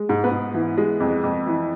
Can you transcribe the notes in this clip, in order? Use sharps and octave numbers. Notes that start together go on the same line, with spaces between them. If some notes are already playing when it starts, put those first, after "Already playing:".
Already playing: G#3
G#2
B3 B4
G#2
E3
G#3
F2
F2
E3